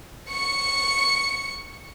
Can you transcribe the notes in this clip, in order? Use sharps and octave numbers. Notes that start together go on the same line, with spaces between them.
C#6 C#7